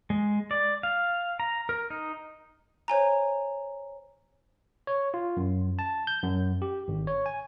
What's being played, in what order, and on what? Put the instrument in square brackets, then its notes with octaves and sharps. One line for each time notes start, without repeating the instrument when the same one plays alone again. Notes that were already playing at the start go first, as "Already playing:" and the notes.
[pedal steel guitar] G#3
D5
F5
A#5
A#4
D#4
[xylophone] C5 C#5 G#5 A#5
[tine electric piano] C#5
F4
F#2
A5
G6
F#2
G4
G#1
C#5
G#5